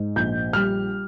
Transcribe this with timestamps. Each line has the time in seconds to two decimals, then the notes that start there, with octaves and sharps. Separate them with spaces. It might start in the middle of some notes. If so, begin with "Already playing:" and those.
Already playing: G#2
0.16 A#1 G6
0.53 G3 F6